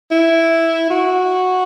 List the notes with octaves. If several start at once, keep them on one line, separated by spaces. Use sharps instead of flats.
E4
F#4